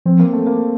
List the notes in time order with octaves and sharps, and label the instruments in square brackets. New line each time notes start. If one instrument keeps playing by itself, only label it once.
[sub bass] F3 [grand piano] C4
[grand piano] A#3
A3
A#3